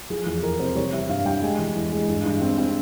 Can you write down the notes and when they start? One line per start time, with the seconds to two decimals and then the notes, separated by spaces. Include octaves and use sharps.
0.10 F3 G#4
0.26 E2 G#4
0.43 E2 A#4
0.60 C3 C5
0.75 G3 C#5
0.93 G3 E5
1.09 G2 F5
1.25 G3 G5
1.42 G#3 G#5
1.58 E3
1.75 E2
1.92 G#3
2.08 G2
2.25 G2
2.41 C4
2.58 C4